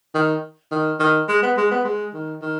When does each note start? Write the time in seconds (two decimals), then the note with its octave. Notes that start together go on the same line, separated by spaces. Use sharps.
0.15 D#3
0.72 D#3
1.00 D#3
1.29 G#3
1.42 B3
1.57 G#3
1.71 B3
1.85 G#3
2.14 D#3
2.42 D#3